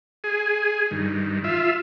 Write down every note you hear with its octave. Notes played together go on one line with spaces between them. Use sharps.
G#4
G2 D#3
F4 E5